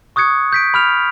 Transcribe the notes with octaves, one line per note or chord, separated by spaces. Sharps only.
C#6 D#6 F#6 G#6 C#7
G6 B6 D7
B5 F6 F7